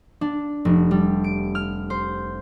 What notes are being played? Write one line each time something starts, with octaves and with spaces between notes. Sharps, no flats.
D4
F1
G3
D7
F6
C5